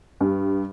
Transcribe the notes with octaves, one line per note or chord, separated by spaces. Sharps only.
G2